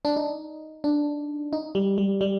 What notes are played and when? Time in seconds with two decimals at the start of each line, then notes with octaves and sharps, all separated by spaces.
0.05 D4
0.16 D#4
0.84 D4
1.53 D#4
1.75 G3
1.98 G3
2.21 G3